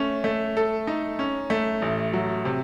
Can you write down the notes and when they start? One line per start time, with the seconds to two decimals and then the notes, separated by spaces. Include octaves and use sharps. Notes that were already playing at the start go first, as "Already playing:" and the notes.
Already playing: A3 C#4
0.24 A3
0.57 A4
0.87 D#4
1.19 C#4
1.50 A3
1.82 A1
2.13 F#3
2.45 C3